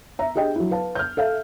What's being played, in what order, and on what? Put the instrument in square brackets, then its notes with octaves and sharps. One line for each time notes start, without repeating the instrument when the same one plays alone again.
[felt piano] E5 A#5
D4 G4 G#4 D#5 G5
F#3 E4
B4 F5 A5
F6 G6
A4 E5 F5